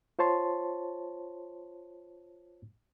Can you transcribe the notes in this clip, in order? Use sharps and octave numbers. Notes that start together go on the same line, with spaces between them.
F4 C5 C#5 A5 C6